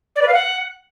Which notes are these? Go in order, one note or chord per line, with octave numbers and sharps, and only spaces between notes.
D5
B4
F5
F#5